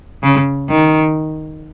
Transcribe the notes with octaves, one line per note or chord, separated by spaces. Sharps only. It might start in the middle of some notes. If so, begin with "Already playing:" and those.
C#3
D#3